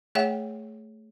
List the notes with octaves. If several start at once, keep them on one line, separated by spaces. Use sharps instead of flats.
A3 G#4 C#5 E5 F#5 G5